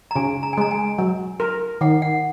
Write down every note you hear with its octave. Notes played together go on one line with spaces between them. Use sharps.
A#5
C#3 G#5
A#5
G#5
G#3 A#5
G#5
F#3
A#4
D#3 F#5
F#5